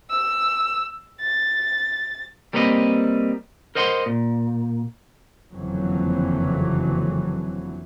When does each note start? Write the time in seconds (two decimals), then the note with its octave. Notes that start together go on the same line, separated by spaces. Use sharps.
0.11 E6
1.21 A6
2.53 G3 A#3 C4 B4 C#5 D#5
3.75 A#4 C5 D#5 F#5 B5 C6
4.06 A#2
5.52 F#1 F2 D3 E3 F#3